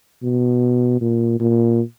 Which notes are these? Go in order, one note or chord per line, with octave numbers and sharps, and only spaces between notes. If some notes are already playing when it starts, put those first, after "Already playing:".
B2
A#2
A#2